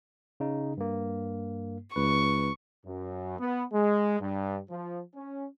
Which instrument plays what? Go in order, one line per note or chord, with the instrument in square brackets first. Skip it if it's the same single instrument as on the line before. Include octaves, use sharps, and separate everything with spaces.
[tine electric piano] C#3 D#4
G2 A#3
[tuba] C#2 [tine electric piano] B4 [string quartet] C#6
[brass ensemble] F#2
B3
G#3
G2
F3
C#4